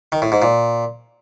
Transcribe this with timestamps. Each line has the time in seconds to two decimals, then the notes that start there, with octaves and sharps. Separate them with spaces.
0.12 D#3
0.22 A2
0.32 G#2
0.42 A#2